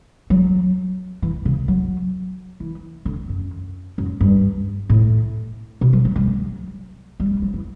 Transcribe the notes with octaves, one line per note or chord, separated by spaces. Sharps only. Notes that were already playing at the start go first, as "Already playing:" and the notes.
F#3
E3
C#3
F#3
E3
D3
F#2
F#2
G2
A2
B2
F#3
F#3
G3
F#3
G3
G3
F#3
E3